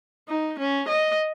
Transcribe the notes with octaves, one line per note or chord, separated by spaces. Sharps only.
D#4
C#4
D#5